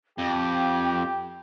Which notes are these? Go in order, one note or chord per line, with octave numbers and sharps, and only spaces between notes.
F2 G4 G5